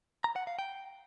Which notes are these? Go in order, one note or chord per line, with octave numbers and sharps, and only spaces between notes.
A#5
F#5
F5
G5